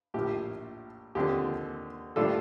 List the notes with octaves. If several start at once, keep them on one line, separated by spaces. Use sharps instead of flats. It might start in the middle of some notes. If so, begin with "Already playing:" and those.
A#1 A2 F3 G4
D#2 D3 F3 C4 G4
A2 G3 D4 F4 A4